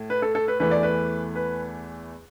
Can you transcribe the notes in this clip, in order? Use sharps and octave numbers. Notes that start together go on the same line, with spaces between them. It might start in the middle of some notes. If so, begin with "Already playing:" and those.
Already playing: A2
B4
A4
A4
B4
E2 E3 A3 B4
D5
B4
B4